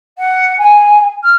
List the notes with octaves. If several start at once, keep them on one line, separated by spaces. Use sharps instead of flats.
F#5
G#5
F6